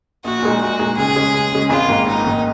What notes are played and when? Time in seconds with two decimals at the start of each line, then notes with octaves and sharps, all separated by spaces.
0.24 A#1 F#4
0.42 A#2 G#3 D#4
0.61 A#1 F#4
0.79 A#2 G#3 D#4
0.97 C#2 G#4
1.16 C#3 G#3 C#4
1.34 C#2
1.53 C#3 G#3 C#4
1.70 G#1 F4
1.89 G#2 D#3 A#3
2.07 G#1 D#4
2.24 G#2 D#3 A#3